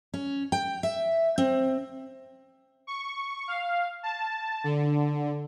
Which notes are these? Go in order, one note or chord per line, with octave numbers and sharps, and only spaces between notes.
C#4
G5
E5
C4
C#6
F5
A5
D3